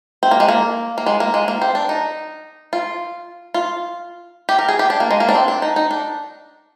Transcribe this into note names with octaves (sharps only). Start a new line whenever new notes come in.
C4
A#3
G#3
A#3
A#3
G#3
A#3
G#3
A#3
C4
D4
D#4
F4
F4
G4
A#4
G#4
G4
D4
A#3
G#3
A#3
D4
C4
D4
D#4
D#4
D4